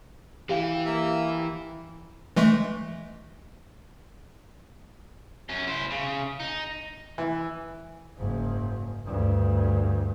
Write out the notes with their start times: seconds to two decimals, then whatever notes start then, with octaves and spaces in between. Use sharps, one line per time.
0.49 E3 E4 G4 F5 G5
0.85 A#3 E5
2.36 E3 G#3 A3
5.49 F#2 C#4
5.67 E4 C5
5.91 C#3
6.40 D#4
7.18 E3
8.17 F#1 G#2
9.05 D2 G2